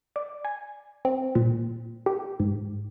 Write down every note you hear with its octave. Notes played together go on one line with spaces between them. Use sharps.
D5
G#5
C4
A#2
G4
G#2